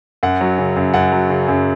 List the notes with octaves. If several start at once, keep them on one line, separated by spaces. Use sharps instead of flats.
F#2 F#5
F#3
C#3
F#2
F#2 F#5
F#3
C#3
F#2